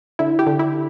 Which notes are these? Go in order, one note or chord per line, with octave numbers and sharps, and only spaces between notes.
D3 E4
G4
D3
E4